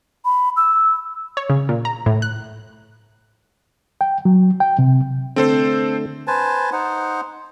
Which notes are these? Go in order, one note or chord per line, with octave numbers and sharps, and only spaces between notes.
B5
E6
C#5
C#3
A#2
A#5
A2
F#6
G5
F#3
G5
C3
D3 A3 C4 A4 C5
B4 C5 G#5 A5
D#4 C5 F#5